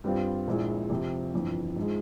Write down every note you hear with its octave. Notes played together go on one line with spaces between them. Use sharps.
G2 G3 C4 F4
A#1 A#2 G#3 E4
F2 C3 F3
G1 F2 E3
G#2 F3 G#3